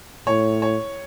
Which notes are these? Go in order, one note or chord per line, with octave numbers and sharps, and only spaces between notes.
A2 C#5
C#5